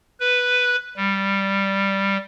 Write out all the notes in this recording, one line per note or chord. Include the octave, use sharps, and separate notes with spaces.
B4
G3